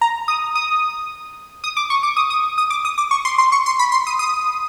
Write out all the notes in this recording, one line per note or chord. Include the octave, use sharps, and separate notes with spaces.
A#5
D#6
D#6
D#6
D6
C#6
D6
D#6
D#6
D#6
D6
D#6
D6
C#6
C6
C6
C#6
C6
B5
C6
D#6
D#6